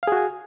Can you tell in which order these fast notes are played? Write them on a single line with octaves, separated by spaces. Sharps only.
F5 G#4 F#4 G#5